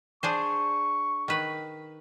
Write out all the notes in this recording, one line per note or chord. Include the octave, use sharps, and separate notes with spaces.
D4 G#4 C5 C#6
D#3 B4